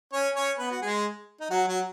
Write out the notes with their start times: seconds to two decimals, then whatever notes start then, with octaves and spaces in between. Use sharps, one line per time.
0.13 C#4 C#5
0.36 C#4 C#5
0.58 B3 B4
0.71 F#4
0.81 G#3 G#4
1.41 D#4
1.51 F#3 F#4
1.68 F#3 F#4